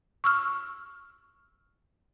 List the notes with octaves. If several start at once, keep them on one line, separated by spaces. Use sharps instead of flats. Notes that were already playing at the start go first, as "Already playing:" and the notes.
C#6 E6 F6